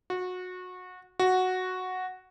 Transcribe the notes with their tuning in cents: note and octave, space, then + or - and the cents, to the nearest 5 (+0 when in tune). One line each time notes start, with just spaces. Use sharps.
F#4 -25
F#4 -5